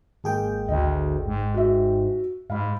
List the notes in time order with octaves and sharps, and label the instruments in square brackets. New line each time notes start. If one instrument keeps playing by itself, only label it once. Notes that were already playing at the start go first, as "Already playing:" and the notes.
[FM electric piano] G#1 G#4 G5 [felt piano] G#3 A#3
[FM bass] D2 [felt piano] D#5
[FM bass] G#2
[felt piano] F#4 E5
[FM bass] G#2 [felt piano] F5 B5